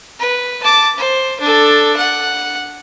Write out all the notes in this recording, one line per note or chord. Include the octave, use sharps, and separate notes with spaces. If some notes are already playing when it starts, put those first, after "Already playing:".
B4
A5 D6
C5
D4 A4
F#5